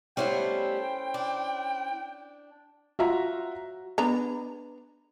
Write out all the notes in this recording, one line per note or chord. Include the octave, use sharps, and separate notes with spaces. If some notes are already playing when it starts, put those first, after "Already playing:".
G3 A3 B3 C#4 E4 C5 G5
D4
F4 F#4 E5 A#5
B3 D4 A#5